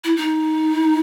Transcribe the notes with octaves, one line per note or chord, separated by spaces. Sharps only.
E4
D#4